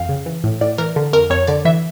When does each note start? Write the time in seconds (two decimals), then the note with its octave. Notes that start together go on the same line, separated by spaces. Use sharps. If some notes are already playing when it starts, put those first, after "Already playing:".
Already playing: F2 E3 F5 G5
0.09 C#3
0.26 E3
0.44 A2
0.61 A2 D5
0.78 E3 A#4
0.96 D3
1.13 F2 A#4
1.30 F2 C#5
1.47 D3 D5
1.65 E3 E5